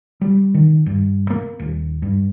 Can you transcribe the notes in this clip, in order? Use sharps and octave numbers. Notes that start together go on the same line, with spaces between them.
G3
D#3
G2
A#3
D#1
G2